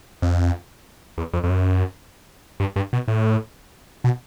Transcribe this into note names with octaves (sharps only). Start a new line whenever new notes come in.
F2
E2
F2
F2
F#2
G2
G2
B2
A2
B2